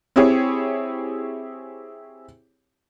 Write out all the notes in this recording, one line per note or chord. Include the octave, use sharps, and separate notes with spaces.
C4 E4 G4 G#4 C#5